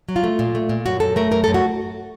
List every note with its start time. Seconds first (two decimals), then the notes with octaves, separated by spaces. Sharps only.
0.09 F#3
0.16 F4
0.24 A3
0.39 A#2
0.55 A3
0.69 A#2
0.86 F#2 F#4
1.00 F#2 A4
1.16 A3 A#4
1.31 F#2 A#4
1.44 F#2 A4
1.54 F#4